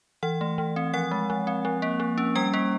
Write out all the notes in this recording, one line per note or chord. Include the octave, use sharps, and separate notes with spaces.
E3 F#5
A3
E3
C4
F3 F#5
G#3
F3
C4
F3
A#3
F3
C#4
G3 G5
A#3